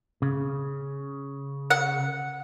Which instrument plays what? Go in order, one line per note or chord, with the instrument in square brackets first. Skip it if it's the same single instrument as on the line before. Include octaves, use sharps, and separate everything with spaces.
[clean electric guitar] C#3
[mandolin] F#5